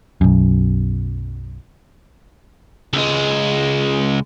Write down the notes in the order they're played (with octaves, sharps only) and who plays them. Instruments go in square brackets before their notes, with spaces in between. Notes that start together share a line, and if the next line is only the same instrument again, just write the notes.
[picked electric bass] B1 F#2
[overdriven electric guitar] C#2 G#3